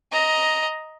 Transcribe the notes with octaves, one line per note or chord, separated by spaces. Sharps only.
D#5 A#5